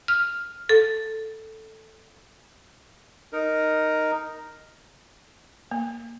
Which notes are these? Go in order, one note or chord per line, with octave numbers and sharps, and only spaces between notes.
F6
A4
D#4 A#4
A#3